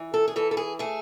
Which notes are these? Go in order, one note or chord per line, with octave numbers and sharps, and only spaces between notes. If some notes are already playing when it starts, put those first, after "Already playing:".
Already playing: E3
A4
G#4
E3 A4
A4
G#4
A3 G#4